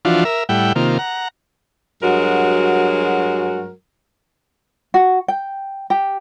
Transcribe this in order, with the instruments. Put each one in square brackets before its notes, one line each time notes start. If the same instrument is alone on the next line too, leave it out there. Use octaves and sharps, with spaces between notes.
[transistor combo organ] E3 F3 D4 F4 F#4
A#4 E5
A2 G3 E4 F#5 G5
C3 D#3 A#3 F4
F#5 A#5
[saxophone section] G2 F#3 G#3 F#4 A#4
[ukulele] F#4
G5
G4